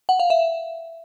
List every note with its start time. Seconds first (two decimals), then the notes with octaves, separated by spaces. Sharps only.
0.09 F#5
0.20 F5
0.30 E5